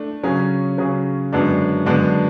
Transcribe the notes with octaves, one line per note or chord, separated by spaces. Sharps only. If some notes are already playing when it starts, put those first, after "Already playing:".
Already playing: A3 D4
C#3 F#3 C#4 G#4
C#3 F#3 C#4 G#4
F#2 D3 G#3 B3 D4
F#2 D3 G#3 B3 D4